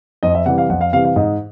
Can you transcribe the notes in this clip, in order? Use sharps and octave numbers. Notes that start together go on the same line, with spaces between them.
F2 D#5
E5
C3 E3 G3 F#5
F5
F2 F#5
F5
C3 E3 G3 F5
F5
G#2 D#5